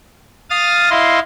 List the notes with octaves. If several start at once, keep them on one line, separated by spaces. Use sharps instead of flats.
F5 D#6 F6 A6
E4 D#5 F5 C6